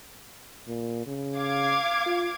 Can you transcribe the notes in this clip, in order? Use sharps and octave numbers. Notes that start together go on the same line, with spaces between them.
A#2
C#3
F5 D6 G#6
F4